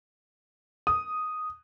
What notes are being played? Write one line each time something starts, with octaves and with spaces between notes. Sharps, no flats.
D#6